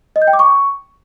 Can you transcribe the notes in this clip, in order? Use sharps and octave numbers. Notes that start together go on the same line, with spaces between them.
D#5
G6
G5
D6
C#6